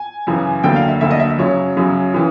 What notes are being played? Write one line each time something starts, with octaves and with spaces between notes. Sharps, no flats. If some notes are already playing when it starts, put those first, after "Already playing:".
Already playing: G#5
F#2 C#3 E3
D2 D3 F#3 A#3 G5
F5
E5
D2 D3 F#3 A#3 E5
D#5
E5
F#2 C#3 F#3 C#5
F#2 C#3 F#3
C#3 E3